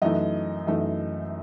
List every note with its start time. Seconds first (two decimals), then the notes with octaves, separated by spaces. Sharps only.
0.02 F#2 E3 A3 D#4 D#5
0.67 F#2 E3 A3 D#4